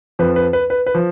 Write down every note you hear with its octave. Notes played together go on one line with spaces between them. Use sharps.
F2 F3 B4
B4
B4
B4
B4
F3